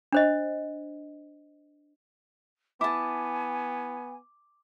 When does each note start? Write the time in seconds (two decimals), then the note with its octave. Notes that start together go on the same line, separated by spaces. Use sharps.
0.12 D4 C5 D#5
2.81 B3 E4 G#5 A5 D6